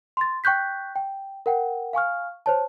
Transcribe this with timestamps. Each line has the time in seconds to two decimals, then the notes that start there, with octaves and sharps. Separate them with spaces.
0.17 C6 A6
0.44 G5 C#6 F#6 G6 B6
0.96 G5
1.46 A#4 F#5 G5
1.93 F5 G#5 C#6 F6
2.46 C5 C#5 A5